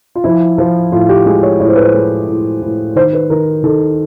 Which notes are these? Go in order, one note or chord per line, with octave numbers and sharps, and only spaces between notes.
F4
F3 E4
F3
A2 F4
G4
G#3 G#4
C#5
A2 C#5
C5
B4
C5
G#3
A2
A2
D#3 C5
B4
D#3 A#4
D#3 A4